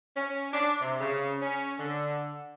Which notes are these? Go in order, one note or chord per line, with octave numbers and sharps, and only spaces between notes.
C#4
D4
C3
C#3
C#4
D3